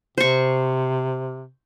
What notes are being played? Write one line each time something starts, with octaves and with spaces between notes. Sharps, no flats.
C3 C5 C#6